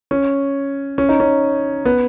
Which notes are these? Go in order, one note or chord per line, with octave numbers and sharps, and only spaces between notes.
C#4
C#4
D#4
C#4
B3